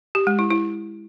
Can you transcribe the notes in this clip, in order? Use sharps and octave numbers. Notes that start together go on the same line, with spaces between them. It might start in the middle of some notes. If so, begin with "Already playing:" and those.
G4
G#3
E4
E4